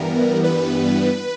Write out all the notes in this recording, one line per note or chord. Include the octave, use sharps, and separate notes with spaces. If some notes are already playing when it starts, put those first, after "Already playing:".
Already playing: G2 E3 G3 B3 A#4
B4